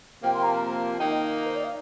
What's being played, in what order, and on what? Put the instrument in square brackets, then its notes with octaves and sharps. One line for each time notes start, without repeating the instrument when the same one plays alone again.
[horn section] C3 F3 A#3 [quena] G5
[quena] C6
A#5
A5
[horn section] D#3 A#3 D#4 [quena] G5
[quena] D#5
A#4
C5
D5
F5